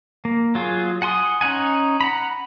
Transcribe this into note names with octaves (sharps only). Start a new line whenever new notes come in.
A#3
F#3 F4 G#4
F#5 G#5 C6 D#6
C#4 D#4 F#5 G#5
F#5 A#5 B5